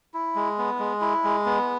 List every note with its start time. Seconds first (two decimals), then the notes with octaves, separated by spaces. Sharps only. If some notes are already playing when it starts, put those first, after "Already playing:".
0.14 E4
0.36 G#3
0.58 B3
0.79 G#3
1.01 E4
1.24 G#3
1.46 B3